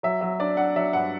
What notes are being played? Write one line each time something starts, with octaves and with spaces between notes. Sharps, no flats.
F#3 E5
F#3 E5
D4 D5
D4 F#5
F#3 E5
G2 F#5